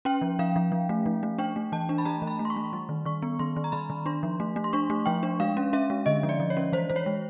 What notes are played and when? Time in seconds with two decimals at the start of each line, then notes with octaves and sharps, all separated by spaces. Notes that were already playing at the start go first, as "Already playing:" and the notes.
0.05 C#4 G5
0.22 F3
0.39 F3 F5
0.56 F3
0.72 F3
0.89 A3
1.06 F3
1.23 A3
1.38 D4 G5
1.56 A3
1.72 E3 A5
1.89 D4
1.98 B5
2.05 A3 A#5
2.22 E3
2.27 B5
2.39 A3
2.45 C6
2.50 C#6
2.56 A3
2.73 G3
2.89 D#3
3.05 D#3 C#6
3.22 B3
3.39 D#3 C6
3.56 D#3
3.64 A#5
3.72 D#3 B5
3.90 D#3
4.06 D4 C6
4.23 F3
4.40 A3
4.56 A3
4.64 C6
4.73 D4 C#6
4.90 A3
5.06 F3 G5
5.23 D4
5.40 G#3 F5
5.57 C#4
5.73 C#4 E5
5.90 G#3
6.06 D3 D#5
6.23 F3
6.29 D5
6.40 F3
6.50 C#5
6.57 C#4
6.73 E3 C5
6.90 E3 C5
6.96 C#5
7.06 G#3